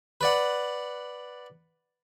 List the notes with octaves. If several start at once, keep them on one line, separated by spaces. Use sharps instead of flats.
B4 D5 F#5